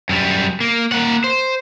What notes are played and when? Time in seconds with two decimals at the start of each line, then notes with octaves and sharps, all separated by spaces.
0.09 F#2 G3
0.61 A#3
0.92 A#3 F#5
1.24 C5